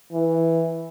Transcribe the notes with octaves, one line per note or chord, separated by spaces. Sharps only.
E3